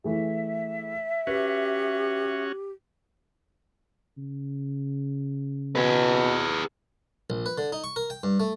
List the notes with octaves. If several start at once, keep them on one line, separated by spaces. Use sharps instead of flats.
E3 A3 G#4 E5
C#4 F#4 G4 B4
C#3
B2 G#4 B4
A#1
B4
D3
D#4
C#6
A#4
G5
G2
A3